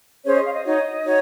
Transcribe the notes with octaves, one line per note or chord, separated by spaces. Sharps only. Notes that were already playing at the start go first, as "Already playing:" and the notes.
C#4 G#4 C5 C#5
D#5
F5
D#5
D#4 F#4 C#5 D#5
D#4 F#4 C#5